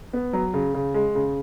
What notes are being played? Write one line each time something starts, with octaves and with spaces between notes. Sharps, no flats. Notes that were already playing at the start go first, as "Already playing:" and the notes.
B3
F#3
C#3
C#3
G#3
C#3